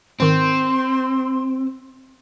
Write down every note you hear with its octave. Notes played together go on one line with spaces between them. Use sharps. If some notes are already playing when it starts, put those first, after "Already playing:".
G#2 D#3 C4 C6